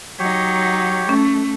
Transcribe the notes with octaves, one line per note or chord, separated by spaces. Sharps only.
F#3 D#4 G4 C#5
A3 C#4